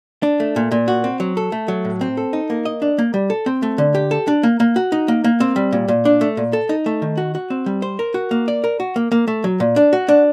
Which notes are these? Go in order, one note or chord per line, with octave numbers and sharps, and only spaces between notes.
D4
A3
A#2
A#2
F#4
C4
F#3
A4
A3
F#3
A2
C4
A4
D#4
A#3
D#5
D4
A#3
G3
A4
C4
A3
D3
G4
A4
D4
A#3
A#3
F#4
D#4
A#3
A#3
C4
G3
A#2
A#2
D4
A3
A#2
A4
D#4
A3
D#3
F#4
F#4
C4
G3
C5
A#4
F#4
A#3
D5
A#4
F#4
A#3
A#3
A3
F#3
A#2
D4
F#4
D4